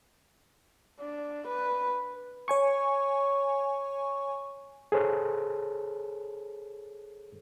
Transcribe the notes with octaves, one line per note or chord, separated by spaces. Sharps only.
D4
B4
C#5 G#5 C#6
G#4 A4 C5 C#5